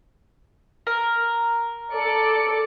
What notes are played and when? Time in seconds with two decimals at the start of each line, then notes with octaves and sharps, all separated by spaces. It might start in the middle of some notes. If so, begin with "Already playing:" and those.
0.87 A#4
1.93 A4 D5 C#7